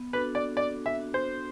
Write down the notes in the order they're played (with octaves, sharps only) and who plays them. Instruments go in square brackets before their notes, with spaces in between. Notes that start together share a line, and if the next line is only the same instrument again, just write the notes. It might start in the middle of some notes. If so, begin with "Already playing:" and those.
Already playing: [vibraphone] B3
[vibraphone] D4 F#4 A4 [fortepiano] B4
[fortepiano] D5
[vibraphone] B3 [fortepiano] D5
[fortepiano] E5
[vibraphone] D4 F#4 A4
[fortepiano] C5